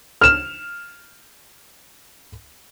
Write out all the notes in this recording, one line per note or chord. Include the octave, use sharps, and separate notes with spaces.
F6 E7